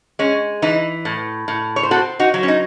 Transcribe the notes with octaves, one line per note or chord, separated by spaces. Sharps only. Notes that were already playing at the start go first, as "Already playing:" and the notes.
G#3 C#4
E3 D#4
A2
A2
C#5
C5
C4 F#4 A4
D#4 F#4
F#3
C#4
D#4